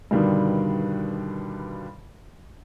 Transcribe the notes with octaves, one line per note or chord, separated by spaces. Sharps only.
G2 B2 D3 D#3 G3